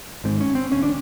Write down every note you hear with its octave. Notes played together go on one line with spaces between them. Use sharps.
G#1 G#2 C4
C#4
C4
E1 D#2 D3 C#4
D4